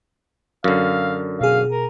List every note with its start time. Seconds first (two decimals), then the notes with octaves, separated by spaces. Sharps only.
0.64 F#2 D3 F5
1.41 B2 G#4 F5
1.72 A#4